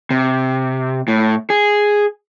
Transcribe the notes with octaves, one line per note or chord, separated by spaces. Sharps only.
C3
A2
G#4